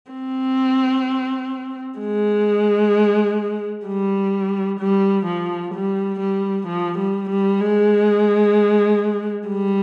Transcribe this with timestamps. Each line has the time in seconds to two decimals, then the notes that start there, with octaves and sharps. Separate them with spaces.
0.11 C4
1.99 G#3
3.87 G3
4.79 G3
5.26 F3
5.74 G3
6.20 G3
6.67 F3
6.98 G3
7.30 G3
7.61 G#3
9.48 G3